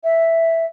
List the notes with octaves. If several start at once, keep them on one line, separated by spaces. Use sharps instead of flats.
E5